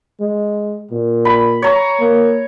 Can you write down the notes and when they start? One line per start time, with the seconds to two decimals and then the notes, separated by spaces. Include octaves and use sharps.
0.20 G#3
0.91 A#2
1.25 B5
1.62 C#5 A#5
2.00 A#3